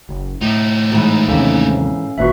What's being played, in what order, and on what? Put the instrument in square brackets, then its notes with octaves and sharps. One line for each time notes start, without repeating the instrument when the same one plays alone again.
[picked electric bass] F#1
[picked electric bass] A2 [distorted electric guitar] A3 D#4
[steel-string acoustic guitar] G#2 E3
[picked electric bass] D#2 C3 [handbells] C#4 A4 F5
[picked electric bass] G#1 A#2 [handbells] F#4 B4 E5